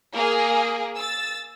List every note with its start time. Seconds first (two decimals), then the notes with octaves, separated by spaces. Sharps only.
0.14 A#3 G#4
0.96 E6 A6